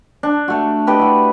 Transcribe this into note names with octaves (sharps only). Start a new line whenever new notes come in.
D4
A3 F#4
G4 B4 D5 D#5
E4 F#4